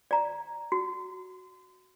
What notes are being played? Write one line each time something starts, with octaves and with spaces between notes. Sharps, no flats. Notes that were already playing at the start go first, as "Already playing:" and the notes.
D5 A#5
F#4